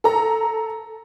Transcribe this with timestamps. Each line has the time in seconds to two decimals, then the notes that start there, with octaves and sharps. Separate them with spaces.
0.04 A4 A#5